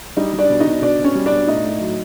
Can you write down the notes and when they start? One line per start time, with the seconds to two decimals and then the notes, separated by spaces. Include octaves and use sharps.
0.17 G3 D#4 D#5
0.33 G3
0.38 D4 D5
0.50 B2
0.60 D#4 D#5
0.66 B2
0.82 B2 D4 D5
0.99 B2
1.04 C#4 C#5
1.15 G3
1.26 D4 D5
1.31 B2
1.47 A2 D#4 D#5
1.64 A2
1.81 F#3